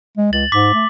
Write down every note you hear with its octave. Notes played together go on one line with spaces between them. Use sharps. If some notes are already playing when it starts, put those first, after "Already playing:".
G#3
C#2 A6 F#7
G#2 D6 B6
A3